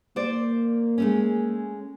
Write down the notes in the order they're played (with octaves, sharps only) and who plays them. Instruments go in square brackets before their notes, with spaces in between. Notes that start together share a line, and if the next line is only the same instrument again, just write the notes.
[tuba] A#3 [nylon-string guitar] C5 D5
[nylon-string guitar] G#3 A3 C#4